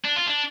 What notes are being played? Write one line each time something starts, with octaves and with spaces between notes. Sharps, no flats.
D4
F4
D4